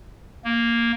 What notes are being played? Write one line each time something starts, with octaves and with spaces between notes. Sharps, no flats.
A#3